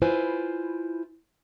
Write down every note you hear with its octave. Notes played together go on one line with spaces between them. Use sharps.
E4 F4 B4 C5 G#5